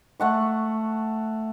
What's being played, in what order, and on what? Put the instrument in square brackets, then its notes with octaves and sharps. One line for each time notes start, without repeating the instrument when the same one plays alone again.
[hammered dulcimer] A3 F#5 C#6